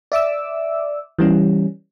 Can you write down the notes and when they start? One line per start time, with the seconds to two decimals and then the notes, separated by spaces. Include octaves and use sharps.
0.12 D5 E5 D6 E6
1.19 E3 G3 C#4